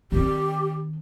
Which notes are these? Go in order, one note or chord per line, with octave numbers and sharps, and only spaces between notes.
D#3 C4 G4